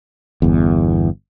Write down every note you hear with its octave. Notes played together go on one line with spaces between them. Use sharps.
G1 E2